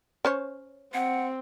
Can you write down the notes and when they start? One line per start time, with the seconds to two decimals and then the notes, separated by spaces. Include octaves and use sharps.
0.25 C#4 C5 C#5
0.94 C4 F#5